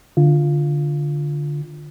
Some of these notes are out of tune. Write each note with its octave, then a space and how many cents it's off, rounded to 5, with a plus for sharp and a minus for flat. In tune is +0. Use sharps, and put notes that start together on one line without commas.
D3 +0 F4 +0